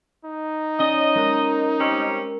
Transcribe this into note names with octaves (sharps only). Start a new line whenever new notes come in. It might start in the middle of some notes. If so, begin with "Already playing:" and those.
D#4
C#4 D5 D#5
G#3 A#4 F#6
G3 C4 C#4 A#4